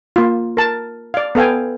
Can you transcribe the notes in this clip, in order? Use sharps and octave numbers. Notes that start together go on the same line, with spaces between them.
A#3 F4
A#4 A5
D5 F5
B3 A4 F5 G5 G#5